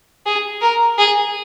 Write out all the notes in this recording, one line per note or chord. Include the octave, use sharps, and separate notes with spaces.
G#4
A#4
G#4